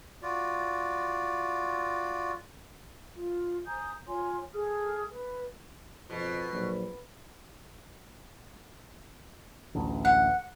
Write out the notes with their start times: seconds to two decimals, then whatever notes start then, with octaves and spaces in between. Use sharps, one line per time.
0.23 F4 F#4 D5
3.15 F4
3.66 G#5 A#5 D#6 G6
4.07 F4 C#5 G#5 C6
4.54 G#4 A4 D#6 F6
5.10 B4
6.10 F2 B2
6.53 A#1 F#3
9.75 A1 D2
10.05 F#5